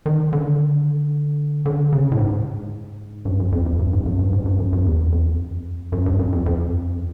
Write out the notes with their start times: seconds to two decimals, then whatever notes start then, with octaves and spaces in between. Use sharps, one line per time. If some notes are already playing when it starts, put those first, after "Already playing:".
0.06 D#3
0.33 D3
1.66 D3
1.93 C#3
2.12 A2
2.19 G#2
3.25 G2
3.40 F#2
3.52 F2
3.66 F2
3.79 G2
3.93 G#2
4.06 F#2
4.19 G2
4.33 G#2
4.45 G2
4.60 F#2
4.73 F#2
4.86 E2
5.12 F2
5.92 F#2
6.06 G2
6.19 F#2
6.33 F2
6.46 F2